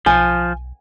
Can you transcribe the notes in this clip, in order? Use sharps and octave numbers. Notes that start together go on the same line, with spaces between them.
B1 F3 G#5